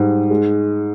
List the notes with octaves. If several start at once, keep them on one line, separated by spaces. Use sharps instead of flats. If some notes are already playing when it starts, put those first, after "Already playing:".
Already playing: G#2 G3
G#3